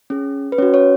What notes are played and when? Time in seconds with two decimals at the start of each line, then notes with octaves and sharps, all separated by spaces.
0.10 C#4 G#4
0.52 B4
0.58 C#4 F#4 C#5
0.74 C#5